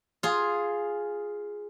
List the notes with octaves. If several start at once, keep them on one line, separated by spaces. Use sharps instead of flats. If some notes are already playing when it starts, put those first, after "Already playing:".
F4 G#4